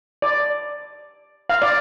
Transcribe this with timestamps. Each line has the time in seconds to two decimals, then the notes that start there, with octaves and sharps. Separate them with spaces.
0.22 D5
1.49 F5
1.62 D5